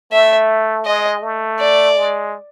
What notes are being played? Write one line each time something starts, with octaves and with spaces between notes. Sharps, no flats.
A3 E5
G#3 D#5
A3
D5
G#3